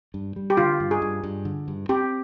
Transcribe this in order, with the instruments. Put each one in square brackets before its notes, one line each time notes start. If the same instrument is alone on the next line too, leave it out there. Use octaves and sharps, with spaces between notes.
[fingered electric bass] G2
G3
[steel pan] G4
[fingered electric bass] D3 [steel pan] F4
[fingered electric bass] G2
[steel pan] G#4
[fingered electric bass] G2
G2
D3
G2
[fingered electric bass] C4 [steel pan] G4